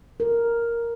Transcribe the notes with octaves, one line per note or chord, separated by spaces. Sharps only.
A#4